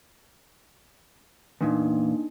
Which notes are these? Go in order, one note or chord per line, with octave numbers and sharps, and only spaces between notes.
E2 A#2 A#3 D4 D#4